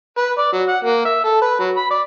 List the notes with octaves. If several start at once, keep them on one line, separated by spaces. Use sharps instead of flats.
B4
D5
F#3
F#5
A#3
E5
A4
B4
F#3
B5
D5